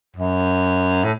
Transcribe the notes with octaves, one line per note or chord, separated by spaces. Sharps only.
F#2
A2